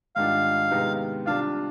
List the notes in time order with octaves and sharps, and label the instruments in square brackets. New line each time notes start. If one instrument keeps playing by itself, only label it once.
[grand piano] G#2 D#3 G3 D4 F4 [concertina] F5
[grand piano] C3 D#3 G#3 B3 D#4
[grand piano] C3 G3 D4 F4 [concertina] F5